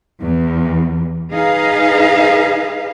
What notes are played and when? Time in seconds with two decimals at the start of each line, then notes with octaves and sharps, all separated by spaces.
0.21 E2
1.33 D#4 G#4 B4 F5